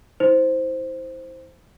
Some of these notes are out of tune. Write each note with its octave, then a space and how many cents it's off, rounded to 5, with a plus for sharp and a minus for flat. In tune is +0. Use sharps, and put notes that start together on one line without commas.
E4 -30 C5 +0